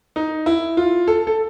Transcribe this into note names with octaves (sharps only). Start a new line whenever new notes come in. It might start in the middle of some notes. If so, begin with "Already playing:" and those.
D#4
E4
F4
A4
A4